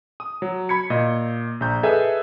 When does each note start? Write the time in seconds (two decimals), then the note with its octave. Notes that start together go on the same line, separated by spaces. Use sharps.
0.20 D#6
0.42 F#3
0.69 B5 G#6 C#7
0.90 A#2 D#5
1.60 A#1 A#5 G6
1.83 G#4 A4 B4 D#5 E5 G#5